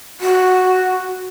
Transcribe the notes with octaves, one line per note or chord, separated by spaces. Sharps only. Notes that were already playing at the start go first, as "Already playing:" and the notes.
F#4